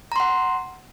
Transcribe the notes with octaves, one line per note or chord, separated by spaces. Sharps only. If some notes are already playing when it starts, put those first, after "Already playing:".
F#5 A#5 C6